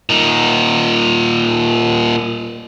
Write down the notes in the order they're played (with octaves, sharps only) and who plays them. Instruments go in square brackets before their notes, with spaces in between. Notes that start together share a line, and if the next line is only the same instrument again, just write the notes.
[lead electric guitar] A#2 D#4